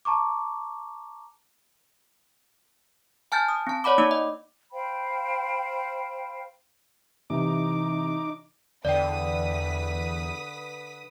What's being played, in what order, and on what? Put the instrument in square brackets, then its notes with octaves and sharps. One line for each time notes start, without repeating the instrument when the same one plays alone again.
[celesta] A5 A#5 C#6 D6
[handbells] G#5 A5 F6 G6 A6
D#6
C4 A5
C#5 D5 F#5 B5 D6
A#3 D#4 D5 D6
D#5
[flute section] C5 F5 G5 B5
[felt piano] C3 E3 [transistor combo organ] D#4 D6
[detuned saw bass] E2 [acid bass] D3 [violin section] B4 D#6 B6 [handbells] D5 G5